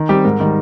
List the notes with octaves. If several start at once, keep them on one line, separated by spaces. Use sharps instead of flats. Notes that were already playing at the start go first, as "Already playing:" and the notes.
Already playing: D#3
G3 C4 G4
G#2 A#4
D#3 G3